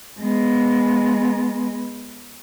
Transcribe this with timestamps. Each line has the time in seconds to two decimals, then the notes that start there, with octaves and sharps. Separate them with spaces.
0.20 G#3 B3